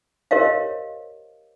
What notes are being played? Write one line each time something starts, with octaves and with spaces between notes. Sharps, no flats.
G4 A#4 C5 C#5 D#5 F5